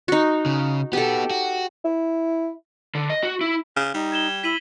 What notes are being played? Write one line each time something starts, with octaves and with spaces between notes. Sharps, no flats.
D#4 F#4
C#3
B3 F#4 G4 A4
F#4
E4
D3
D#5
F#4
E4
C#3
G3 D#4
G#6 E7 G7
E4 B6 D#7 F#7